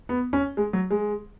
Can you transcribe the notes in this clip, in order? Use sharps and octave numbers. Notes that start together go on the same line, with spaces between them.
B3
C#4
G#3
F#3
G#3